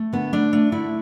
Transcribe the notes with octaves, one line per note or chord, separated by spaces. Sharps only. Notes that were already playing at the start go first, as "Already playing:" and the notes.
Already playing: A3
D3 B3
A3 D4
A3
D3 E4